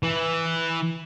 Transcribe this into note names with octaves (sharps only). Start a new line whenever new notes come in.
E3